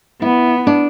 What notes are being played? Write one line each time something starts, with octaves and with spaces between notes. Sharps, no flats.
B3 E4
D4